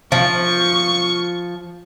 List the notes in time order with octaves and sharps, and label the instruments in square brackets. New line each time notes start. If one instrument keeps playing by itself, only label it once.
[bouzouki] F3 [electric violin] C#6